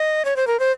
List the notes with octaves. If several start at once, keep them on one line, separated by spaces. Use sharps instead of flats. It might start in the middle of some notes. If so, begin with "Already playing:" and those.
Already playing: D#5
C#5
C5
A#4
C5